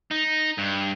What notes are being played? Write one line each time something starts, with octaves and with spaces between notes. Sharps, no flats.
D#4
G2